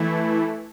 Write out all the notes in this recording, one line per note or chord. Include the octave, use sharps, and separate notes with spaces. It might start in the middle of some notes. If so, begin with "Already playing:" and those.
Already playing: E3 A3 E4